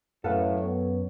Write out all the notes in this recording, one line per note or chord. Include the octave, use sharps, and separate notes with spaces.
F#2 A2 A4 B4 F5 F#5 A5
B3 C#5